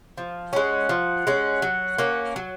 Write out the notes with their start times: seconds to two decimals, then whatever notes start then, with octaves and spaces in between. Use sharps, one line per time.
0.18 F3
0.53 G#3 C#4 F#5
0.89 F3
1.27 G#3 C#4
1.62 F#3
1.98 A#3 C#4
2.36 F#3